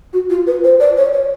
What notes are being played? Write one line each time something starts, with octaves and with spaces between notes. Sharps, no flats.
F#4
F4
B4
C5
D5
C#5
C#5